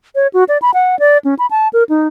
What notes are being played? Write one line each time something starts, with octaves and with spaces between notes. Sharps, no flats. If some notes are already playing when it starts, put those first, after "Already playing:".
C#5
F#4
D5
B5
F#5
D5
C#4
B5
A5
A#4
D#4